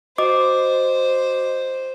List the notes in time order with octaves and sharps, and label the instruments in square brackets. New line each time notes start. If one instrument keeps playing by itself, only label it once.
[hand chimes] F#4 D#5 D6 [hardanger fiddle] C5